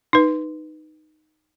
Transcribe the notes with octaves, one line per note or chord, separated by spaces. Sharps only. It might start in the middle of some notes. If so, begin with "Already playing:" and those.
D#4 B4